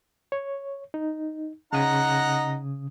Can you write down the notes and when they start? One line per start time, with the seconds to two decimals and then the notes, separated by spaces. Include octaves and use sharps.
0.32 C#5
0.94 D#4
1.73 C#3 D#4 F#5 A#5 D#6